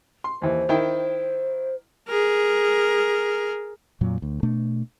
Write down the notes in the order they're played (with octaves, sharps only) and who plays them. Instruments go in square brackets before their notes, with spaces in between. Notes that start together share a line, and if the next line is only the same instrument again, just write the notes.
[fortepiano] C6
[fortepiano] D#2 E3 [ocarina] C5
[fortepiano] D#3 E4 G5
[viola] G#4 A#4
[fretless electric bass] F2 A#2 F#3
D2
B2 A3 D4